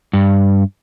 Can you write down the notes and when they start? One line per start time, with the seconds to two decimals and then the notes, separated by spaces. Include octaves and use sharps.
0.13 G2